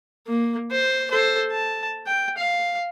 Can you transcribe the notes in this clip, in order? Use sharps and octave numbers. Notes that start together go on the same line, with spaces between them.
A#3
C5
A4 C5
A5
G5
F5